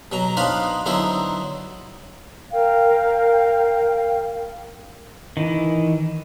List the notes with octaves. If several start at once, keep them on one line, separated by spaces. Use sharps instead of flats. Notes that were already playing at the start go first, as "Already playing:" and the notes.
B2 F#3 A#5
B3 D4 D#4 B4 C5 F5
D3 F#3 B3 D#4 E4 C5
A#4 F5 G5
D#3 E3